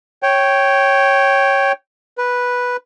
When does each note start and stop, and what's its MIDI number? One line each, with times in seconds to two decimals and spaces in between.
0.23 1.72 73
0.23 1.72 79
2.18 2.77 71